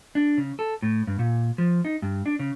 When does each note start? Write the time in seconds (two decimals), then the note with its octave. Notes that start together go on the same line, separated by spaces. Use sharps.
0.15 D4
0.38 C#3
0.59 A4
0.82 A2
1.07 G2
1.19 A#2
1.58 F3
1.85 D#4
2.02 G2
2.26 D4
2.39 C#3